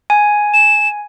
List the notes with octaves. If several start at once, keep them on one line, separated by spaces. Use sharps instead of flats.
G#5
E7